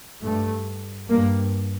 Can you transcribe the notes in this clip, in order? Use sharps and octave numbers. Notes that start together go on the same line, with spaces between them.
G2 A3
G2 A#3